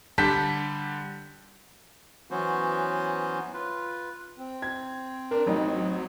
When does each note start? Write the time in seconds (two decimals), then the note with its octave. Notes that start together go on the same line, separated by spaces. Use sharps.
0.18 D3 G3 A5 G6 B6
2.31 E3 F#3 B3 C#4 F#4 C5
3.53 F4 B4
4.38 C4
4.62 G#6
5.31 D4 A#4
5.47 A1 F#3 D#4